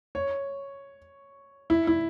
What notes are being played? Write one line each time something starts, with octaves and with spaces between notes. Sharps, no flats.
C#5
E4
E4